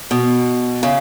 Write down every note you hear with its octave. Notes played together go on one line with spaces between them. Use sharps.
B2
C#3